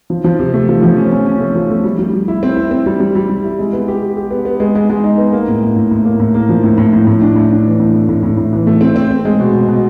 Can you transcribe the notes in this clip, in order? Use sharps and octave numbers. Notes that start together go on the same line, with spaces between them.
F3
F3
C3
A3
F3
F3
C#4
C#4
C#4
A3
F3
A3
G3
G3
G3
E4
C4
E4
C4
G3
G3
G3
G3
E4
G#3
B3
G4
G4
G4
B3
B3
G#3
G#3
G#3
D#4
B3
A#3
A2
A2
A2
A2
A#3
A2
A#3
F3
A2
A2
A2
A2
D4
A2
D4
E3
A2
A3
A2
A2
A2
E3
A3
C4
C4
C4
G#3
B2
B2
B2